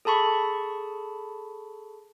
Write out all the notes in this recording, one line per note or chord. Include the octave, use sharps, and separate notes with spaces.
G#4 A4 A5 B5 C#6